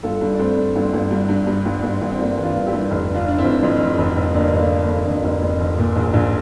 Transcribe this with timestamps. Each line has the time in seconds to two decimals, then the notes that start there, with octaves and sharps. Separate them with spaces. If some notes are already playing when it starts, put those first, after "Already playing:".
0.03 G1 F4 A4
0.21 G2
0.34 D4
0.39 G2 A3 C4
0.57 G2
0.76 G1
0.93 G1
1.11 G2
1.29 G2
1.47 G2
1.66 G1
1.83 G1
2.01 G1
2.11 C4
2.19 G2 A#3 D4
2.37 E3
2.43 D4 F4
2.55 G1
2.66 E4 G4
2.73 G2
2.91 F1
3.09 D3
3.14 D4 F4
3.27 D3 D4
3.38 C4 E4
3.44 F1
3.63 F2
3.80 F1
3.98 F1
4.17 F1
4.34 D3 A#3 D4
4.53 F1
4.58 A#3 D4
4.70 D3
4.82 A#3
4.88 F1
5.06 F1 A#3 D4
5.24 F1
5.42 F2
5.60 F1
5.78 A#2
5.96 A#1
6.14 A#1